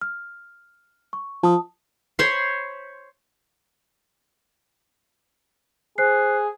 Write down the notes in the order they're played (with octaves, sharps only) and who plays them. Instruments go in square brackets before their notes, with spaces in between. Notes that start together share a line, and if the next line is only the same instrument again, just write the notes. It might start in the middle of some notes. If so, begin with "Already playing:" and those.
[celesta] F6
C#6
[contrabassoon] F3 [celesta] A5 D#6
[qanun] C5 C#5 B5 C6
[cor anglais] G#4 [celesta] C5 F#6 C7